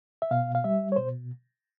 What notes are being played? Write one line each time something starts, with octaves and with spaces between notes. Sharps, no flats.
E5
B2 F5
F5
G3 E5
C#5
B2 C5